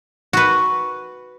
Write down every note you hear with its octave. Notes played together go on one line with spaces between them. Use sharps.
F#4 B4